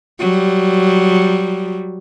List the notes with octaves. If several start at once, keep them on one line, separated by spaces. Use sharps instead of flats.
F#3 G3